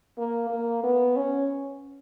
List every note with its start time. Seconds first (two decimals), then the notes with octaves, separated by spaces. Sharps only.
0.18 A#3
0.50 A#3
0.84 B3
1.16 C#4